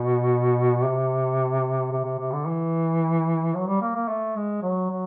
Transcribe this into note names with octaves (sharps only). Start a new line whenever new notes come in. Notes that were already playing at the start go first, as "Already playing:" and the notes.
Already playing: B2
C3
C3
C3
C3
D3
E3
F#3
G3
A#3
A#3
A3
G#3
F#3
F#3